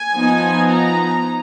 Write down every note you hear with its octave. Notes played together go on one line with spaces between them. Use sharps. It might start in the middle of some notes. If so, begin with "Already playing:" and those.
Already playing: G#5
F3 B3 D#4
A#5